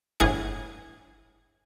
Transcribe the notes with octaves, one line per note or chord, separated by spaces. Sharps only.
G1 A2 E3 G#4 C#7